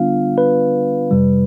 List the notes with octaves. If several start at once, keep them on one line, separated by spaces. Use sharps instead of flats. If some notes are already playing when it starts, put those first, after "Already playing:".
Already playing: D3 G3 B3 D4 F4 F5
B4
F2 C3 G3